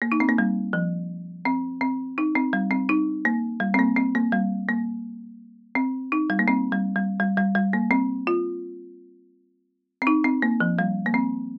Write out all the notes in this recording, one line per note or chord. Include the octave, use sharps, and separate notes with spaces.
A#3
D#4
C4
A#3
G3
F3
C4
C4
D#4
C4
G3
C4
D#4
A#3
G3
C4
A#3
C4
A#3
G3
A#3
C4
D#4
G3
A#3
C4
G3
G3
G3
G3
G3
A#3
C4
F4
C4
D#4
C4
A#3
F3
G3
A#3
C4